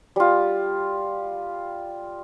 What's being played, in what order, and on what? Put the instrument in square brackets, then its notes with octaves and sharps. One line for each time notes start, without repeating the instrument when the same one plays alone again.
[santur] G3 F4